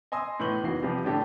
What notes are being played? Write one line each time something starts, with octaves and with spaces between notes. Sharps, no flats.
D#5 G#5 C6 D#6 E6
A2 E3 B3 C#6 G6 F#7
F#1 E2 E3 D#4 F#4 C7
C3 F3 G3 G4 B4
A2 D3 D4 G4 A4